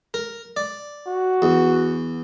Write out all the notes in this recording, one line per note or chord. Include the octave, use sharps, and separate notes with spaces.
A#4
D5
F#4
E2